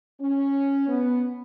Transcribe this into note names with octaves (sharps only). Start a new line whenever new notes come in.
C#4
B3